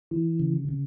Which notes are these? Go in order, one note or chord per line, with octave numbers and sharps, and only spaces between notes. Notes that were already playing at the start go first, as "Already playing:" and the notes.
E3
C#3
C#3